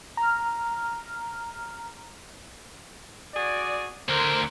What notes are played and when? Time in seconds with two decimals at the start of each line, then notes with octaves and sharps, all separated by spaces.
0.17 A#5 F6
3.35 F#4 G#4 D5
4.09 D2 D3 A#4 C5